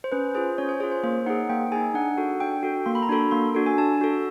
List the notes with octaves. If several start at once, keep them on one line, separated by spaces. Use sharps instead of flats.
C5
C#4 B4
F4 G#4 C5
C#4 C#5
C5
F4 G#4 C#5
C5
A#3 C5
D#4 G#4 F#5
A#3 G5
D#4 G#4 G#5
D4 F#5
F#4 A4
D4 G5
F#4 A4
A#3 C6
B5
A#5
D4 F#4 A4 B5
A#3 C6
D4 F#4 A4
G#5
D4 A5
F#4 A4